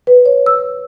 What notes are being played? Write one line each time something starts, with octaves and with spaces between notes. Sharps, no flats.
B4
C#5
E6